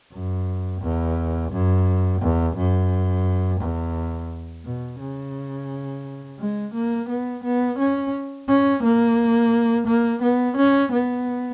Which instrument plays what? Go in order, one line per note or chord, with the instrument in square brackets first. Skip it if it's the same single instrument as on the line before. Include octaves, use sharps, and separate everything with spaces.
[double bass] F#2
E2
F#2
E2
F#2
E2
B2
C#3
G#3
A#3
B3
B3
C#4
C#4
A#3
A#3
B3
C#4
B3